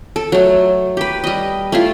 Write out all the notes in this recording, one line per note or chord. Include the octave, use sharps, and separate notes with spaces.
A4
F#3 A3
G4 B4
G3 D#5
A3 E4 F4